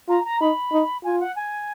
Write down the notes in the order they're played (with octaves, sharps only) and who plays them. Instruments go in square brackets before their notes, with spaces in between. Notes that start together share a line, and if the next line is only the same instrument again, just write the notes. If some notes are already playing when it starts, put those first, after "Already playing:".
[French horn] F4 [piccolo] A#5
[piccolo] A#5
[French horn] D#4 [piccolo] B5
[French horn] D#4
[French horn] F4 [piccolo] G#5
[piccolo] F#5
G#5